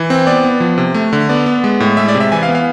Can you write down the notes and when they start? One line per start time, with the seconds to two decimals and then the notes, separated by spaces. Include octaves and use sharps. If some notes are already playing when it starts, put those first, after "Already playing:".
Already playing: E3
0.10 C4
0.27 B3 D5
0.44 B3
0.60 F3
0.78 C3
0.94 A3
1.13 D3
1.29 B3 D5
1.46 B3
1.64 G#3
1.80 A2
1.97 G#3 E5
2.08 D5
2.15 C3
2.20 E5
2.32 E3 G#5
2.43 F5
2.49 B3
2.55 F5